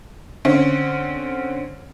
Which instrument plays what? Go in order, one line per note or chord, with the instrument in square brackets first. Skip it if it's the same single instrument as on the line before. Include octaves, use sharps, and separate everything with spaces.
[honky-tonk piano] D3 C4 C#4